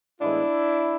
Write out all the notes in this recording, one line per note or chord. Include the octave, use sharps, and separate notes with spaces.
A2 E3 G#3 B3 D4 E4